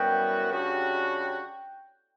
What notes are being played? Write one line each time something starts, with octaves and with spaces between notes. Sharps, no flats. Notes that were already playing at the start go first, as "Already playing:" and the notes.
Already playing: F#2 E3 G3 B3 F#4 G5
C#3 G3 D4 F#4